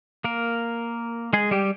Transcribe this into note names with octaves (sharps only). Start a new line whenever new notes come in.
A#3 A#4
G#3 G#4
G3 G4